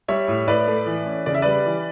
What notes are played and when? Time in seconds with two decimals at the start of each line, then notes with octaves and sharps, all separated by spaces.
0.08 G3 C#5 E5
0.28 A2
0.47 A2 B4 D5
0.68 A3
0.86 E3
1.06 C#4
1.26 C#3 D5
1.35 E5
1.42 G3 B4 D5
1.66 E3